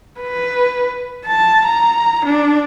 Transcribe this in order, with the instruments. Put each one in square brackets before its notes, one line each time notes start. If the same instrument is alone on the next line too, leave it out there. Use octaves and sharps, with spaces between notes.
[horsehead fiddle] B4
A5
A#5
D4